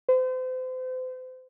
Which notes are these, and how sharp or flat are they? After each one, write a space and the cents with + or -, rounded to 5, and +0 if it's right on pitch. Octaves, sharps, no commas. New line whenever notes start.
C5 -35